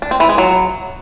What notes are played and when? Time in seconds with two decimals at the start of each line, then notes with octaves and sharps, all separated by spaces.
0.02 D4
0.11 C4
0.20 E3
0.29 G#3
0.38 F#3